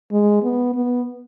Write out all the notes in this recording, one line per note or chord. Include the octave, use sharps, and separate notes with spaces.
G#3
B3
B3